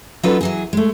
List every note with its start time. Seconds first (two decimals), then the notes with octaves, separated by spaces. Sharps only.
0.23 F#3 C#4 D#4 F4 A4 B4
0.41 E3 F#3 G#4
0.73 G#3 A3